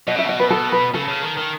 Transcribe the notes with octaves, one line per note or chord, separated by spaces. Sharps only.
B2 D#5
C#3 E5
B2 D#5
B4
A4
B4
C#3 A4
C#3
D#3
D#3